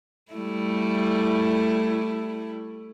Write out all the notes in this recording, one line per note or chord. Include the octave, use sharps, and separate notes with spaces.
G3 A3 E4